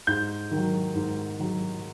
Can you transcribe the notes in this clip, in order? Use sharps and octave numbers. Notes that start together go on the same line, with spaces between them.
G#2 G6
D#3 F#3
G#2
D#3 F#3